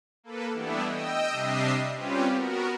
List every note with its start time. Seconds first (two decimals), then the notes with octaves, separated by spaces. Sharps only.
0.24 A#3 A4 B4
0.53 E3 G3 A3 B3 D4 E4
0.85 D#5 G5 E6
1.31 C3 G3 D4 D#5 E5 C7
1.95 G3 C4 C#4 F4 G4 B4
2.32 B3 F#4 A#4